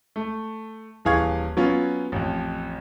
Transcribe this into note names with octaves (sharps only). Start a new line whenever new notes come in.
A3
D#1 E3 G#4 F5 C#6 G#6
F#3 B3 C#4 F4
A1 F2